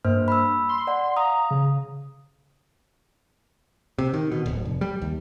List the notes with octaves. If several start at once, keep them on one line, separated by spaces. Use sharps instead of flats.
G2 A#3 C5 F6
B5 E6
C6
D5 F#5
F5 A#5 D#6
C#3
C3
D#3
B2
D1
F1
G3
D#2